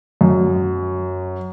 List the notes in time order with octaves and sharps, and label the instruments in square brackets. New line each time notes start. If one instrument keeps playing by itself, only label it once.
[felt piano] F#2